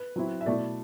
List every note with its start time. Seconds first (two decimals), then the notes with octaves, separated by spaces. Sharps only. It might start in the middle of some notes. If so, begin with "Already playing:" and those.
Already playing: B4
0.16 F#3 C4 E4
0.41 E5
0.46 B2 A3 E4 D5